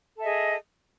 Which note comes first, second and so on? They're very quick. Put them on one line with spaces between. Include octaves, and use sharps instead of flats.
A4 E5 D#5 G#4